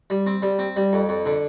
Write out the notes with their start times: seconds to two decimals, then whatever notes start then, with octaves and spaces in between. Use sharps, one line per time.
0.10 G3
0.27 C4
0.42 G3
0.59 C4
0.76 G3
0.93 F2
1.09 F2
1.26 D3